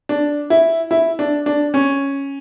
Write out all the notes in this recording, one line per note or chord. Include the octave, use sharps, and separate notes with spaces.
D4
E4
E4
D4
D4
C#4